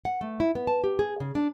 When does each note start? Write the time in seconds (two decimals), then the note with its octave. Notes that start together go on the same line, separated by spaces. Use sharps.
0.05 F#5
0.21 A3
0.40 E4
0.55 B3
0.67 A5
0.84 G4
0.99 G#4
1.20 C#3
1.35 D4